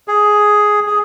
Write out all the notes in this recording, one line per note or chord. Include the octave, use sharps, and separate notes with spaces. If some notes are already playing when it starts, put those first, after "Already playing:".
G#4
G#4